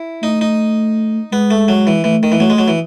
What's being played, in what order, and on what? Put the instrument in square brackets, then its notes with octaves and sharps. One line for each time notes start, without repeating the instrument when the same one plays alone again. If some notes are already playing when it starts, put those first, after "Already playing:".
Already playing: [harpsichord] E4
[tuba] A3 [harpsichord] D#4
[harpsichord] D#4
[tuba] G#3 [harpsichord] B3
[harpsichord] A3
F#3
E3
[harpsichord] E3 [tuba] A3
[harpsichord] D#3
E3
[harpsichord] F#3 [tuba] A3
[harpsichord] G#3
F#3
E3